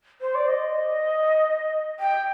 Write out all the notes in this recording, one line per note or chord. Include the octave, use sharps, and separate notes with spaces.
C5
D5
D#5
G5